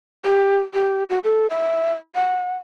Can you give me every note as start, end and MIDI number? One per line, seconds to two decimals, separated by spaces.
0.25 0.57 67
0.74 1.03 67
1.09 1.19 66
1.24 1.47 69
1.50 1.93 76
2.15 2.56 78